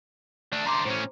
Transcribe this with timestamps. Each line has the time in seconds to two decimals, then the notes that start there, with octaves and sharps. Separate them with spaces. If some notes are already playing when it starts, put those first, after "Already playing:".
0.52 A3 D4
0.66 D3 C5 A#5 C6 D6
0.85 A2 C#4 C5